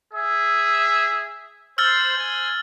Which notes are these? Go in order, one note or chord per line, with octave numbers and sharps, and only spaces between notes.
G#4 E5
C5 E6 F6 A6
C5 G#5